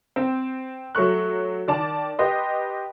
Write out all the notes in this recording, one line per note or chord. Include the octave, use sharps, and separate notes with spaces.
C4
F#3 A3 C#6 F#6
D#3 D5 A5
G4 B4 D#5 C6